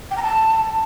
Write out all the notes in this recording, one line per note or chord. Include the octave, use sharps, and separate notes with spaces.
G5
A#5
A5